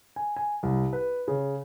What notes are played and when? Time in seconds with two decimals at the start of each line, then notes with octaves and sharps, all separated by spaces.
0.16 G#5
0.36 G#5
0.63 C2
0.93 B4
1.28 C#3